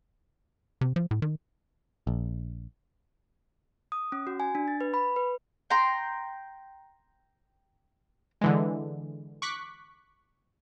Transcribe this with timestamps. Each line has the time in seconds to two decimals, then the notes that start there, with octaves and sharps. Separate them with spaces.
0.81 C3
0.96 F3
1.11 A2
1.22 D#3
2.07 A#1
3.92 D#6
4.12 C#4
4.27 F#4
4.40 G#5
4.55 D4
4.68 A6
4.81 B4
4.94 B5
5.16 B4
5.70 G5 A#5 C6
8.41 D3 E3 G#3
9.42 C#6 D6 F#6 B6